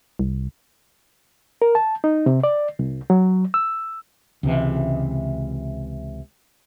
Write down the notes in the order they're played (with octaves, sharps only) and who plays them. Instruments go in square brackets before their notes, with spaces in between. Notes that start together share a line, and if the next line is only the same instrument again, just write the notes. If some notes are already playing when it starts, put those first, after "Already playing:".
[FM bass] C2
[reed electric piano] A#4
A5
D#4
C3
D5
C2
F#3
E6
[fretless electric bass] C#2 C3 E3